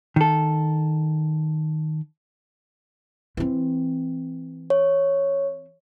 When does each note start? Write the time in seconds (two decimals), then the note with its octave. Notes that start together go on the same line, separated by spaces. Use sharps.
0.16 D#3 A4
3.37 E3 C4
4.70 C#5